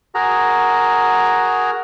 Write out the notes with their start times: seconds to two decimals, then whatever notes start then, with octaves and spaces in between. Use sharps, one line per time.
0.15 F#4 G#4 A#4 A#5